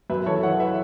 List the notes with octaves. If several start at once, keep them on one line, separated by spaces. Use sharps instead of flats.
F#2 B4 E5
E3 A4 C#5
E3 C#5 F#5
B4 E5